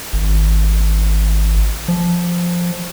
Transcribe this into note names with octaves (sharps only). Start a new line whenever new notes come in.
G#1
F3